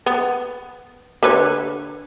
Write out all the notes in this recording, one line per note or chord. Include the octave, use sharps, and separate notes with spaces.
B3
D3 B4 C#5